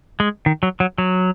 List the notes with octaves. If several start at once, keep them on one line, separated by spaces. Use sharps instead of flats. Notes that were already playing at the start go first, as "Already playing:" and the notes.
G#3
D#3
F#3
F#3
F#3